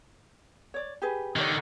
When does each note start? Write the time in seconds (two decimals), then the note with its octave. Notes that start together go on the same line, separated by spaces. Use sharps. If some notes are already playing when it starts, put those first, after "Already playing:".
0.74 C#5 D5
1.02 G4 G#4 B4
1.36 D3 D#3 G4 C#5